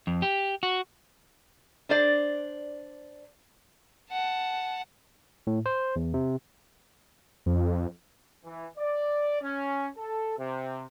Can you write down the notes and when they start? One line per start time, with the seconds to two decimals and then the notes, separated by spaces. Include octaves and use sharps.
0.07 F2
0.22 G4
0.63 F#4
1.89 D4 C5 D5
4.11 F#5 A5
5.47 A2
5.66 C5
5.96 E2
6.14 C3
7.46 F2
8.45 E3
8.78 D5
9.42 C#4
9.97 A4
10.38 C3